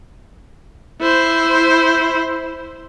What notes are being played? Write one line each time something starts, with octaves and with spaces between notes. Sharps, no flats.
E4 C5